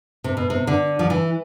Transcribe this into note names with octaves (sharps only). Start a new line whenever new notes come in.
C3
B2
C3
D3
F3
E3